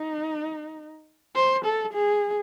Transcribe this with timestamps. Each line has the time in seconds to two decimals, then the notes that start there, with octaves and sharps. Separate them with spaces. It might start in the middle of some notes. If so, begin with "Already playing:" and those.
Already playing: D#4
1.35 C5
1.65 A4
1.93 G#4